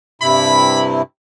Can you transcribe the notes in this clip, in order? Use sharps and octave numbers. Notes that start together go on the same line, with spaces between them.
G2 C3 E4 B5